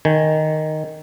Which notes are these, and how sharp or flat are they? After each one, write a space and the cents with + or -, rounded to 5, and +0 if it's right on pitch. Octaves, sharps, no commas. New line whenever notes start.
D#3 +0 G#5 +0